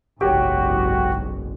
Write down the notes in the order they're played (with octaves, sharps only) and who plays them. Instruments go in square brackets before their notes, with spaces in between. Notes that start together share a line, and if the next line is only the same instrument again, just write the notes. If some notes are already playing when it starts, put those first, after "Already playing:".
[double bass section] F#1 B1 G#2 [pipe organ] F#4 [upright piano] G4 C#5